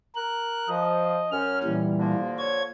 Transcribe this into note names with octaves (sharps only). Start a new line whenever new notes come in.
A#4 F#6
F3 D#5
F#2 C#4 F6
A#2 E3 G3
D3 F3 A#3
C#5 G#6